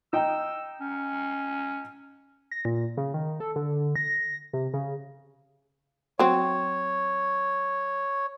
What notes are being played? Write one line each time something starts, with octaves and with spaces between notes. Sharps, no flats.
D#4 G5 E6
C#4
A#6
A#2
C#3
D#3
A4
D3
A#6
C3
C#3
F#3 C4 C#5